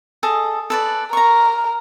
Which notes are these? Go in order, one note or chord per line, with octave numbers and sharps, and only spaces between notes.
G#4 A4 D#5
A4 B4 D5
A#4 A#5 C#6